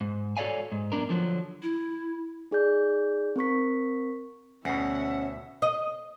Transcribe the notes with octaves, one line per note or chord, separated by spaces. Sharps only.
G#2
F#4 A4 C#5 D5 F5 G#5
G#2
F#2 A#3 B3 D4 A#4
D3 F3 F#3
E4
D#4 G#4 D5 G6
C4 A#4 C#6 B6
D2 B2 C#4 E5 F#5
D#5